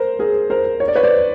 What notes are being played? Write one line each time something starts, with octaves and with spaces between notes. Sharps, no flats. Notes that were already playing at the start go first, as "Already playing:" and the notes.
Already playing: A#4 C5
G#4 A#4
A#4 C5
C#5
D5
B4 C#5
C5 D5